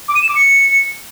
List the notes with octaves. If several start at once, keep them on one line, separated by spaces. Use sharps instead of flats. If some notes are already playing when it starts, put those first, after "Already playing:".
D6
D#7
E7
D6
C#7